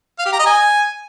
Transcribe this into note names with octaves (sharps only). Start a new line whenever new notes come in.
F5
G4
A#5
D#5
G#5